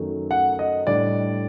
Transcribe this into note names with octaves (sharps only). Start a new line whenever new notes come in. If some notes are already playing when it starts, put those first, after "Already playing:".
Already playing: F#2 D#3 A3
F#5
D#5
A2 G3 D4 D5